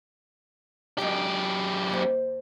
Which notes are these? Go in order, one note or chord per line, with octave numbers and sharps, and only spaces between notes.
F#2 F#3 G#3 D4 G4
D#2 C5